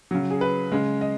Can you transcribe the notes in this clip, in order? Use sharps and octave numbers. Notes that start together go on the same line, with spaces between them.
C#3 F#3
G#4
B4
C#3 G#3
D#5